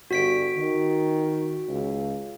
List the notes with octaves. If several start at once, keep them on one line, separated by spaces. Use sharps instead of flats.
G1 F#4 B6 D7
D#3
C#2